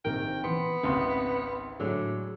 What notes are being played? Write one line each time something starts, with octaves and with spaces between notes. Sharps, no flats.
A#1 C3 D#3 A#4 G5
E3 B3 C6
G#1 C#2 C3 C6 D#6
A2 D3 F#3 G#3